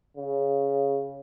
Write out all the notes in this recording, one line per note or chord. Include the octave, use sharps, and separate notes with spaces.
C#3